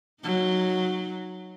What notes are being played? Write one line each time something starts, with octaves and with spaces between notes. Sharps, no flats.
F#3 D#4